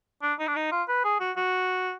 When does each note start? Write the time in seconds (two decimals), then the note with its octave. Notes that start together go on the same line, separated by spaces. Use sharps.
0.22 D4
0.39 D#4
0.48 D4
0.56 D#4
0.72 F4
0.88 B4
1.04 G#4
1.20 F#4
1.37 F#4